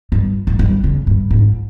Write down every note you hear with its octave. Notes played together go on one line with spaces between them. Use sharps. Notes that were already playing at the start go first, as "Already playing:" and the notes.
G2
G#2
G2
C#3
G2
G#2